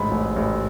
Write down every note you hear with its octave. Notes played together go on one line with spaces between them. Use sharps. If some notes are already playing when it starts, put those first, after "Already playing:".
Already playing: A1 G#2 B5
A1
A1